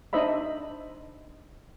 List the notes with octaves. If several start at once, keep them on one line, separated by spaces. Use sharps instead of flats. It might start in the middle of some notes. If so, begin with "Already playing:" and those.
D4 D#4 C5 D#5 E5 B5